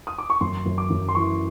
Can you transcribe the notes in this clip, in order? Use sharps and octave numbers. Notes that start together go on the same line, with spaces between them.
D#6
D6
C#6
F#2 C6
F#2
D6
F#2
C6
E3 C#6